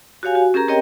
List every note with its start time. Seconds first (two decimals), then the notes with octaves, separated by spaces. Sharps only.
0.23 F#4 G4 C#5 F5 G#5
0.35 F#4
0.54 C#4 G4 G#4 A#4 A#5
0.68 C4 G4 A#4 C#5 D#5 G5